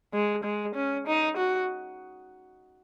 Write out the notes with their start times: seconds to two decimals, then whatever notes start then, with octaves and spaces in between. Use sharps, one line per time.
0.13 G#3
0.44 G#3
0.75 C#4
1.07 D#4
1.37 F#4